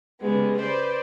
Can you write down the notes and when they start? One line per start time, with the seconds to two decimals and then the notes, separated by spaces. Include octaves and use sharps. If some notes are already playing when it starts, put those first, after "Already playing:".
0.21 C#3 G3 G#3 B3
0.57 B4 C5 D5